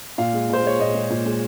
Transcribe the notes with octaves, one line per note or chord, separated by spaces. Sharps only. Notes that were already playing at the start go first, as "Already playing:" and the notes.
A#2 F5
G#3
A#2 C5
G#3 C#5
A#2 D#5
G#3
A#2
G#3